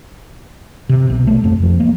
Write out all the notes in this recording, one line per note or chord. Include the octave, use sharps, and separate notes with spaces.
C3
B1
A3
F2
F3
A#3